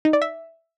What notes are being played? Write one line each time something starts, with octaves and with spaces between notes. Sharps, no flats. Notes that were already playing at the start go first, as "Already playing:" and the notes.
D#4
D5
E5